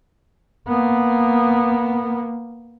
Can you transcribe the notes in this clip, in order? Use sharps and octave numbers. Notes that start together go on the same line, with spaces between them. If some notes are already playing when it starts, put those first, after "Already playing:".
A#3 B3